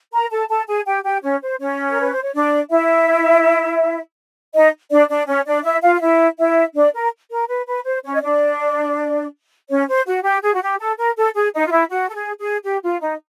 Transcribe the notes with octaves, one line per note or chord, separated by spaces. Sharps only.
A#4 A#5
A4 A5
A4 A5
G#4 G#5
G4 G5
G4 G5
C#4 C#5
C5
C#4 C#5
A#4
B4
C5
C#5
D4 D5
E4 E5
D#4 D#5
D4 D5
D4 D5
C#4 C#5
D4 D5
E4 E5
F4 F5
F5
E4 E5
E4 E5
D4 D5
A#4
A#4
B4
B4
C5
C#4 C#5
D#5
D4 D5
C#4 C#5
C5
F#4
G4
G#4
F#4
G4
A4
A#4
A4
G#4
D#4
F4
E4
F#4
A4
G#4
G#4
G4
F4
D#4